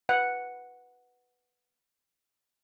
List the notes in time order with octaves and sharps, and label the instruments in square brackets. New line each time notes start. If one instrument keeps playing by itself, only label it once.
[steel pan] B4 F#5